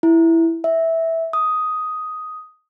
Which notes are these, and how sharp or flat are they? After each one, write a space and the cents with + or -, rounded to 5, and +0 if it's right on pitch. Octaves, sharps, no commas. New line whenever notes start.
E4 +0
E5 -10
D#6 +5